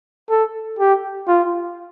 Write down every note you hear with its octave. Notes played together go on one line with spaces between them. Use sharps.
A4
G4
F4